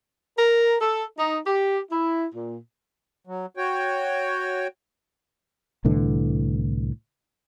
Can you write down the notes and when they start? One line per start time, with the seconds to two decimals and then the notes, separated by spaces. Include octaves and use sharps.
0.38 A#4
0.80 A4
1.17 D#4
1.46 G4
1.91 E4
2.34 A#2
3.27 F#3
3.57 F#4 C#5 G5
5.85 C2 A2 D3 E3